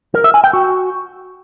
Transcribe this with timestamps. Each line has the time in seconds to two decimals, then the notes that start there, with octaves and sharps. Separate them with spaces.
0.15 A#4
0.24 E5
0.34 G#5
0.44 G5
0.53 F#4